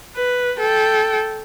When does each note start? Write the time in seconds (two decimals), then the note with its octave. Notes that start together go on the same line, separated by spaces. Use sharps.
0.16 B4
0.59 A4 G5